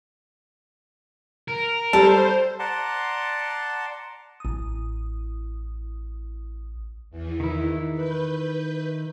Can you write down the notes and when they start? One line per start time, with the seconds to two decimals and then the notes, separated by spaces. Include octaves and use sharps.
1.48 A#4
1.93 G3 A4 C5
2.59 D5 F#5 A5 A#5 C6
4.40 A1 D#6
7.10 E2 E3
7.40 D#3 E4
7.93 B4 G6